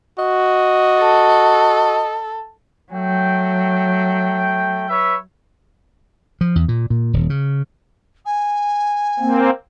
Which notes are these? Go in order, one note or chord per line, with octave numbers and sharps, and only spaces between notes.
F#4 D#5
A4
F#3 A3 G5
B4 C#5 E5
F3
E2
A#2
A#2
D#1
C#3
G#5
A#3 C4